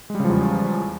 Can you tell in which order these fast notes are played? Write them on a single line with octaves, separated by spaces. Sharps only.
G#3 G3 C#3 F3 E2